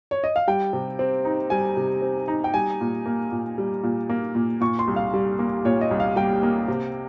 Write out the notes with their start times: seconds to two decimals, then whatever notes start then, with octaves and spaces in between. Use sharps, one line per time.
0.11 C#5
0.24 D#5
0.36 F5
0.48 G3 G5
0.73 C3
0.99 C4
1.25 D#4
1.50 G3 G#5
1.77 C3
2.02 C4
2.28 D#4
2.44 G5
2.54 G3 G#5
2.81 A#2
3.06 A#3
3.32 A#2
3.58 G3
3.83 A#2
4.09 A#3
4.35 A#2
4.61 A#2 C#6
4.79 C6
4.87 C2
4.96 F5
5.14 G3
5.39 A#3
5.65 A#2 C#5
5.81 D#5
5.91 C2
6.00 F5
6.16 G3 G5
6.43 A#3
6.68 C3